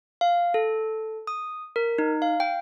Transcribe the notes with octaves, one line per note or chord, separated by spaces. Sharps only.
F5
A4
D#6
A#4
D#4
F5
G5